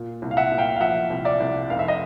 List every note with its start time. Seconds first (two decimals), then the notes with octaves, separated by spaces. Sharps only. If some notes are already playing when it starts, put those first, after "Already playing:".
Already playing: A#2
0.22 C2
0.31 F5
0.37 E5 F#5
0.52 A#2
0.58 F5 G5
0.76 F5
0.81 F3 E5 F#5
1.10 C2
1.25 D5 E5
1.40 C2
1.70 F1 F5
1.79 E5
1.88 D#5